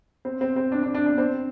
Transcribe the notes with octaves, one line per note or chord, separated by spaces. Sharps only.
C4
C4
C4
D4
D4
D4
D4
C4